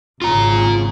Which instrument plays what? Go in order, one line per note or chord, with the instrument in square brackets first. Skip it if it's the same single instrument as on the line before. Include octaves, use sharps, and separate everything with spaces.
[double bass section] G#1 G#2 C#3 [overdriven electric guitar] F4 A#5